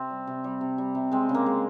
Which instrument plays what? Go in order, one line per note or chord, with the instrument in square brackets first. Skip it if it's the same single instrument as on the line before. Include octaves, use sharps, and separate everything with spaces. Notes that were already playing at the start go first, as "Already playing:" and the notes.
Already playing: [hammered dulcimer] C3 C4
G3
C3
G3
C3
G3
C3
G#3 C4
C#3
A#3
G#3